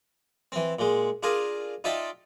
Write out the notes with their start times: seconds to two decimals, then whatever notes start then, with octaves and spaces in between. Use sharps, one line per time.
0.52 E3 C4
0.79 A#2 G#3
1.23 D4 F4 G#4 A#4
1.84 D#4 F4 D5 E5 G5 A5